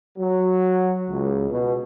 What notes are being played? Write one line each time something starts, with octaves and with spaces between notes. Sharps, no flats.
F#3
C#2
B2